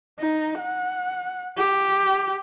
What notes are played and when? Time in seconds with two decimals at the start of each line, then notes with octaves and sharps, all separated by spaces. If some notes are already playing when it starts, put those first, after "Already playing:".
0.20 D#4
0.59 F#5
1.58 G4